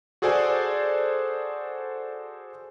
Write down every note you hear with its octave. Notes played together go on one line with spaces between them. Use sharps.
F#4 G#4 A4 C5 D5 G#5